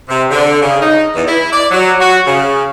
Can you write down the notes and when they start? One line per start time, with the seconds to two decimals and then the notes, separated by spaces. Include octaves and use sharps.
0.09 C3
0.31 D3
0.62 C#3
0.80 D#4
1.15 E2
1.26 E4
1.53 D5
1.71 F#3
1.99 F#4
2.27 C#3